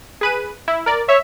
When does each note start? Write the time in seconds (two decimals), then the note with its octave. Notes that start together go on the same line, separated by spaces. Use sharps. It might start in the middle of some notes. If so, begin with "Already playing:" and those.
0.21 G#4 B4 D#7
0.68 E4
0.86 A#4 D5
1.09 C#5 E5